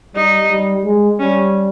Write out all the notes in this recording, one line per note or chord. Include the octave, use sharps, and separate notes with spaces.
G3 D#4
G3
G#3
G3 C#4